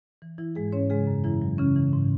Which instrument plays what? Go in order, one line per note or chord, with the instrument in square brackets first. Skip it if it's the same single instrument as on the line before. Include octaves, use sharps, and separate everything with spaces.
[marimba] E3
E3 E4
G#2 G#3 G#4
G#2 C#4 C#5
C#3 G#3 G#4
F#2
F#2 E3 E4
F#3
C#3 E3 C#4
E3
G#2